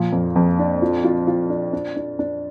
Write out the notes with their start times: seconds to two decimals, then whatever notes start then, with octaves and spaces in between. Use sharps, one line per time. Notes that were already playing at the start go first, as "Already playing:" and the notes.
Already playing: A#2 F3
0.12 F2
0.36 F2
0.59 D4
0.82 F4
1.04 F4
1.27 F4
1.50 D4
1.73 D4
1.96 D4
2.19 D4